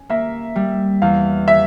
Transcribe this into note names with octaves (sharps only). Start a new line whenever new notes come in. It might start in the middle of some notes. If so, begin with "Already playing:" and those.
Already playing: C#4
A#3 E5
G3
E2 F5
E3 E5